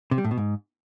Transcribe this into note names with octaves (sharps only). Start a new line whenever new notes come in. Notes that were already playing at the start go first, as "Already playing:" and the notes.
C3
G3
A2
B2
G#2